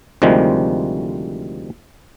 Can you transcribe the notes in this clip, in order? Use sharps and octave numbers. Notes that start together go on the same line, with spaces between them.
D2 C3 D#3 F3 G3 G#3